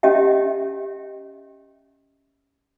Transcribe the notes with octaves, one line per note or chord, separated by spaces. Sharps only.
C#4 G4 D#5 E5 G5